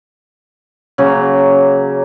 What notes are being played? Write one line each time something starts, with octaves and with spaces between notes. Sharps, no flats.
C#3 F#3 A#3